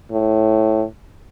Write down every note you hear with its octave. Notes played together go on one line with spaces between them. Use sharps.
A2